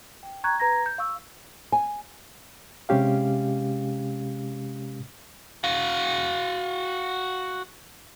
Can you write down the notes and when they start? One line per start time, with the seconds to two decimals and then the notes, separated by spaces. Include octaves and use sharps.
0.23 G5
0.44 G5 A#5 C#6 F#6 G#6
0.60 B4 A#5 G#6 A#6
0.86 G6
0.98 F5 C#6 E6
1.72 G#5
2.89 C3 G#3 C#4 G4 F5
5.64 F#4 F5